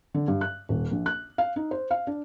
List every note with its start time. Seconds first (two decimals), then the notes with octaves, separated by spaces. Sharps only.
0.14 D3
0.28 G2
0.41 F#6
0.69 D#1
0.91 A#1
1.06 F#6
1.38 F5
1.56 D#4
1.71 C5
1.91 F5
2.07 D4